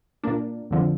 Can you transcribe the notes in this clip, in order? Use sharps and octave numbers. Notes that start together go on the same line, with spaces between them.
A#2 A#3 D4
F2 D3 F3